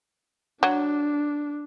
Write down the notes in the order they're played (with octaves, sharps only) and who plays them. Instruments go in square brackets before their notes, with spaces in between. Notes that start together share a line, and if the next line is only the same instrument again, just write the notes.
[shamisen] F#3 [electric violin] D4